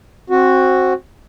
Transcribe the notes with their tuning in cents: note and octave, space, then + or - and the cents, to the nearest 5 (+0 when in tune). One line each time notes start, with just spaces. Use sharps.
C4 +20 F#4 +0